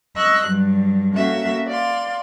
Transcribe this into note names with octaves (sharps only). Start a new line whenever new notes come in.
D#5 C#6 E6 F#6
G2 F#3 G3
A#3 C#4 F#4 A4 E5
D5 F5 C6